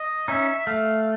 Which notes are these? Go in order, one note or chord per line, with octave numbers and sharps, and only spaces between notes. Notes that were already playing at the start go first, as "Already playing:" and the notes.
Already playing: D#5
C#4 D#4 E5
A3 F5